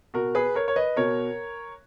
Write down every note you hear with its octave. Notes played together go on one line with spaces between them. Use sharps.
B2 F#4 A#4
G#4 B4
A#4 C#5
C#5
B4 D#5
B2 A#4 C#5